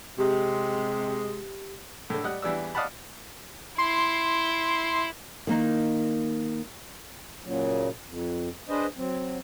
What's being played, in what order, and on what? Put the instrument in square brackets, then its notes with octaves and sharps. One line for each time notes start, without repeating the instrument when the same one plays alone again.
[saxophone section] C3 G#3 [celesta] G4
[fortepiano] A2 D3
G3 D#5 F#5
E2 E3 G3 D4 E6
D5 D#5 F5 F#5 A5 B5
[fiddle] E4 [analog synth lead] C6
[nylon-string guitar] D#3 A#3 D#4
[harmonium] A#2 C#3 F#3
F2
D4 G#4 B4 C5 D#5
F#3 C4